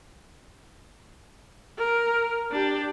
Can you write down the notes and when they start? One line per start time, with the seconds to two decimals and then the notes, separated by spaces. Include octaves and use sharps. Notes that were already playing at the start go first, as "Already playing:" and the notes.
1.78 A#4
2.51 D4 G4